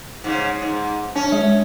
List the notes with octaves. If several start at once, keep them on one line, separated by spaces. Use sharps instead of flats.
G#2 C#3
G#2
C#4 D4
G#3